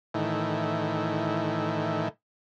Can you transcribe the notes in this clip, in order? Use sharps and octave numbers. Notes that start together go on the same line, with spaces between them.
A2 D#3 E3